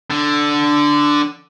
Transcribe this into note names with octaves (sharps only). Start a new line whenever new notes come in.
D3